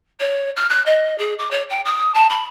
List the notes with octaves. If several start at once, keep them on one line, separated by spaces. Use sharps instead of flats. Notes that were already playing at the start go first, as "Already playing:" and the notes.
C#5
F6
F#6
D#5
G#4
D6
C#5
G5
D#6
A5
B5